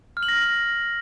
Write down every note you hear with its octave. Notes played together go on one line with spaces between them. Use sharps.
F6
F#7
A#6